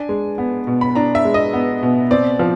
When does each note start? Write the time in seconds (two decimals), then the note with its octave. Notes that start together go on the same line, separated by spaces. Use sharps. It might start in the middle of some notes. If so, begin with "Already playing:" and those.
Already playing: D4 G#5
0.09 G#3
0.38 B3
0.67 B2
0.81 B5
0.95 D4 A#5
1.15 E5
1.25 G#3
1.34 D#5
1.53 B3
1.83 B2
2.11 C4 D5
2.39 F3